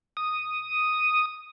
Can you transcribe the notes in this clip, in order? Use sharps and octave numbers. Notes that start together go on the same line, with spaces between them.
D#6